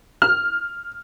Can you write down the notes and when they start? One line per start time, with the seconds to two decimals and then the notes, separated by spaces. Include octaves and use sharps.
0.22 F6